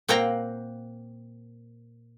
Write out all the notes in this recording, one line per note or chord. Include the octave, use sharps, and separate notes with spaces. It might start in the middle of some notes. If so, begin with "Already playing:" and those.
A#2 A#3 C4 F#5 G5 A#5